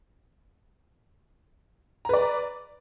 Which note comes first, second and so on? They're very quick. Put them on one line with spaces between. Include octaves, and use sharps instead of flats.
A#5 B4 D5